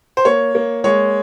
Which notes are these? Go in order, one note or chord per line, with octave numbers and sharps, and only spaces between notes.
C5
A#3 C#5
A#3
G#3 C#5